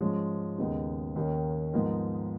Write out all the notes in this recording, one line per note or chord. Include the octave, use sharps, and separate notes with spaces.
G#2 F3 G#3 C#4
D#2 C#3 G#3 B3 D#4
D#2 D#3 A#3 C#4
G#2 F3 B3 D#4 A#4